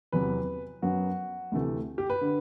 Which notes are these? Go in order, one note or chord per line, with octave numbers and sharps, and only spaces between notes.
E2 C3 F#3 B4
F#2 F#3 B3 F#4
D2 C3 E3 A3
G4
B4
D3